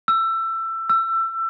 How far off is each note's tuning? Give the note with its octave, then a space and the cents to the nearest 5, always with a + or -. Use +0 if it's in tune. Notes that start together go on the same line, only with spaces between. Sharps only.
E6 +20
E6 +25